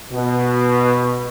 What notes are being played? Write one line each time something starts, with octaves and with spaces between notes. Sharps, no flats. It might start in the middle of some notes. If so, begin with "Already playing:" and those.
B2